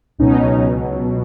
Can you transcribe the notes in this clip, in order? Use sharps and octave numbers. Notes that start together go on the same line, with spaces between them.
C#2 B2 F#3 C#4 D#4